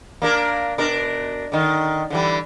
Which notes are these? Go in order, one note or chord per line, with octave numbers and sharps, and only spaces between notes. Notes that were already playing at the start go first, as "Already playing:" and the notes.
A#3 D4 A#4
B2 D4 A#4
D3 D#3
D3 E3 G3